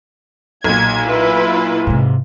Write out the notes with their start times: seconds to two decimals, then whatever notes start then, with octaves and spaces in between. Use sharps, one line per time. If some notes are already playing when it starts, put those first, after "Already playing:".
0.64 B1 A#2 G#6
1.06 E4 F4 B4
1.87 G#2 C3